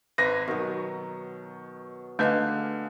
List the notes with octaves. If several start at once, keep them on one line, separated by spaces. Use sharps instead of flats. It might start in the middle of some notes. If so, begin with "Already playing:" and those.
G#1 B4 A#6
B2 D#3 F#3
D3 A3 G#4 B4 D#5 F5